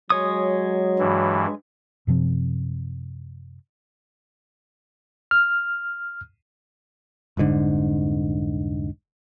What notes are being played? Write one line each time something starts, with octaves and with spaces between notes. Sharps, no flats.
F#3 G#3 C#5 D#6
G2 E3
F#2 C3 F3 C4
F6
F1 C2 G#2 D3